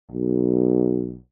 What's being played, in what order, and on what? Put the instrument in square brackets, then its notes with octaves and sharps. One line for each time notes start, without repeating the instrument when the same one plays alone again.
[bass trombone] B1